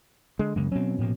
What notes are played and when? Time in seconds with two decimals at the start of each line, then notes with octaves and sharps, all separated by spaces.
0.39 D3 G#3
0.56 F#2 C#3 G#3 A#3
0.72 B2 F#3 C4 C#4
0.98 A2 F3 A#3